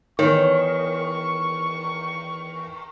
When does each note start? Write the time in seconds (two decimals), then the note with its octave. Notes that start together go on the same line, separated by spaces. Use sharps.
0.19 E2 D#3 C#5 C#6